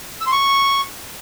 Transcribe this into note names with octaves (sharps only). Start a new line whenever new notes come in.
E6
C6
C#6